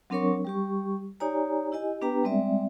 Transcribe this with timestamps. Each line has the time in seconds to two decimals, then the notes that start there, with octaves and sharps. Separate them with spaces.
0.10 F#3 C4 D4 A#4 C#5 C#6
0.45 G3 G4 C#6
1.20 D#4 G4 C#5 D5 G#5 A#5
1.72 E4 G4 D#5 G#5
2.01 B3 D4 G4 B4 G5 A#5
2.23 G3 G#3 C4 D5 E5